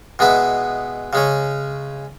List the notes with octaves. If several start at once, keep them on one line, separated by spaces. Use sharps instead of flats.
B2 G#3 B3 E4
C#3 G#3 C#4